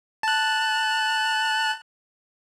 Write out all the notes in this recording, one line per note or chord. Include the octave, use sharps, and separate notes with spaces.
A5 F#6